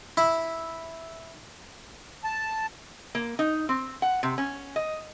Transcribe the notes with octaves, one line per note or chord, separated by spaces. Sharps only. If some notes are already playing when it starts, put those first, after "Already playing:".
E4
A5
A#3
D#4
C4
F#5
C3
C#4
D#5